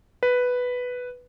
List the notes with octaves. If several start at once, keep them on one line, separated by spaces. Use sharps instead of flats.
B4